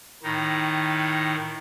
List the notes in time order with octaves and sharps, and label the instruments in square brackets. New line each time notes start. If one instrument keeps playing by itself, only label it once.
[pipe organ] A2 D#3 D#4